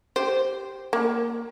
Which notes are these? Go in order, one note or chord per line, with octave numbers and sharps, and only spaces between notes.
G4 C5
A#3